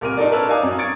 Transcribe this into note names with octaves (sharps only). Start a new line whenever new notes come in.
C2 A#2 A#4 F6 D#7
D4 D#4 A4 A#4 D5
A#4 B4 C#5 D5 A5 E6
D#4 D5 F5 G#5 D6 D#6
F#2
C#6 G#6 A6 C#7 D7